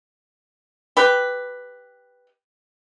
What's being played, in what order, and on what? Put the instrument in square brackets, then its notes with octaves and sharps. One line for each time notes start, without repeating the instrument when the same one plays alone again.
[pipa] G4 B4